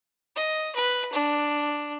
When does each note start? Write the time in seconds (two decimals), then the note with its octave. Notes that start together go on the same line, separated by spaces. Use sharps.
0.36 D#5
0.75 B4
1.13 D4